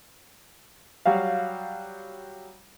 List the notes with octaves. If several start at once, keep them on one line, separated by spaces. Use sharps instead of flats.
F#3 G3 F#4 F5